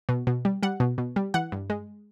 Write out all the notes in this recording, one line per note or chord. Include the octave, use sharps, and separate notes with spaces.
B2
B2
G3
G3 F#5
B2
B2
G3
E3 F#5
G2
G#3